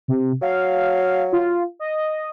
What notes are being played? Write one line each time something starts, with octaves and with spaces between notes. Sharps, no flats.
C3
F#3 F5
F4
D#5